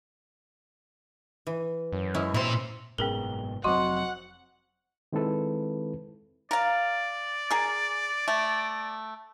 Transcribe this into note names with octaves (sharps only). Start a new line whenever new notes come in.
E3
F#2
G#3 C#4 E4
A#2 C4 E4 C6
F#1 G#2 B2 C#4 G#4 A#4 G5 G7
F1 F#3 C4 F#4 D#5 F#5 C6 C#6
D#3 G#3 C4 E4 A4 B4
A#4 D5 F5
G#4 A#4
A3